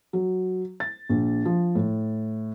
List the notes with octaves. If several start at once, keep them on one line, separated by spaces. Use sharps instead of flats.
F#3
A6
A#1
F3
A2